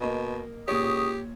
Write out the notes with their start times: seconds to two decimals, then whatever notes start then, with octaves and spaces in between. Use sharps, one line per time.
0.01 B2 A#3 D#5
0.68 C#2 A#2 G4 C#5 C#6 D#6